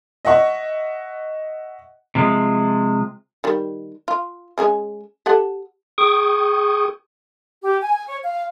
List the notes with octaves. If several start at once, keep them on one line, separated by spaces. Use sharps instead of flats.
D#5 E5 F#5 C#6
C3 F3 G#3
D#3 G3
F4
G#3 C#4 G#4
G4 A4 F#5
G#4 G5 C#6 D#6
G4
G#5
G#5
C#5
F5